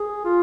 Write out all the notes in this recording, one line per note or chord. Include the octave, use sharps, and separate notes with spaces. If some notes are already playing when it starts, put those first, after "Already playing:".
Already playing: G#4
F4